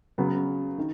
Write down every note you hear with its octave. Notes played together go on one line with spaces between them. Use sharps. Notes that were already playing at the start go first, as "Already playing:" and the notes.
C#3 F#3 B3
D#3